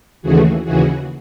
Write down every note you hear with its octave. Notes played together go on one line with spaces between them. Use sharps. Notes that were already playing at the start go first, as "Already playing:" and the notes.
D#2 C#3 E3 A3 F#4 G#4
D#2 C#3 E3 F#4 G#4